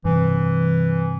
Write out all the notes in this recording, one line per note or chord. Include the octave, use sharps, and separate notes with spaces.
G2 C3 E3